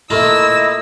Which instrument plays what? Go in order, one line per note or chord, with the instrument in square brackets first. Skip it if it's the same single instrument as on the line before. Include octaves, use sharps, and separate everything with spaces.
[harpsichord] A3 A#3 F4 [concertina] E4 D#5 [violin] E6